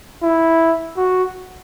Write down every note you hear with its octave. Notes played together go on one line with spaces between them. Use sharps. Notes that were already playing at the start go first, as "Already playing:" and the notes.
E4
F#4